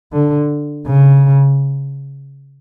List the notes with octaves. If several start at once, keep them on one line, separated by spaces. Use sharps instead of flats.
D3
C#3